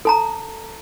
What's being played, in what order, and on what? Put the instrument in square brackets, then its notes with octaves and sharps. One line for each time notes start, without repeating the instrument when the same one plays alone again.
[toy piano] A4 A5 A#5